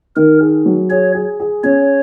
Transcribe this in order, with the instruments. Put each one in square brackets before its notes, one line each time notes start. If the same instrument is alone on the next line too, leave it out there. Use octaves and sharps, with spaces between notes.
[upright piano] D#3 [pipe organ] A#4
[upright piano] G#4
F#3
[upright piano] G#4 [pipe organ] C#5
[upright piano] G#4
G#4
[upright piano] C#4 [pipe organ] C#5